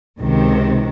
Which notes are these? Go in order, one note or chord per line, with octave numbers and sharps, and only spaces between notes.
C#2 C3 D#3